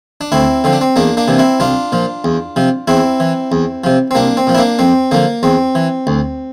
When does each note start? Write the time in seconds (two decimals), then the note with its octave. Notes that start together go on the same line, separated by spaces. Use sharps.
0.21 D4
0.32 D2 C4 E4
0.64 D3 F3 C4
0.73 D4
0.81 C4
0.96 E2 A#3 D4
1.17 A#3 D4
1.28 C3 E3
1.38 C4 E4
1.60 C2 D4 F4
1.92 A#2 F3
2.24 E2
2.56 C3 F3
2.88 E2 C4 E4
3.20 E3
3.52 E2
3.84 C3 F3
4.11 C4
4.15 C2 A#3 D4
4.37 C4
4.47 A#2 F3
4.55 E4
4.58 A#3 D4
4.79 F2 C4
5.11 D3 F3 A#3
5.43 E2 C4
5.75 E3
6.07 D2